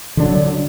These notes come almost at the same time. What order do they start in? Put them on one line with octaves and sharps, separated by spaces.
D3 D4 F#3